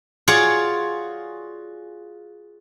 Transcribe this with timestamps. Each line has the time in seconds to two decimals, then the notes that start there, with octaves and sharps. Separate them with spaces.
0.28 F4 F#4 G#4 C#5 D5